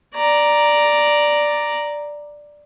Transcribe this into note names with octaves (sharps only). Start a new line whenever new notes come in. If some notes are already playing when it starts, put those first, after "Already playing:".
D5 A#5